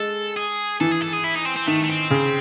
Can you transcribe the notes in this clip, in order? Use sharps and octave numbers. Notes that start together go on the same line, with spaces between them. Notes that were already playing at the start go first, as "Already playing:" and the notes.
Already playing: G#3 A4
G#4
E3 A4
G#4
A4
G#4
E4
D#4
C4
C4
D#3 A3
A3
C4
C#3